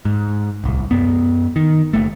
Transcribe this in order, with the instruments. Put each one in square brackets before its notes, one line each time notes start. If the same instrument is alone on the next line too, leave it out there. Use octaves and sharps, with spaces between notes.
[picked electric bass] G#2
D1 C2
F#2 B3
D#3
F#1 A3